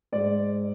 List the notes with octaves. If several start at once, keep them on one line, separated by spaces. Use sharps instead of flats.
G#2 G#3 D5